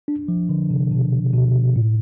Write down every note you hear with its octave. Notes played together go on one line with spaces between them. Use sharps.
D4
F3
D3
C3
B2
B2
A2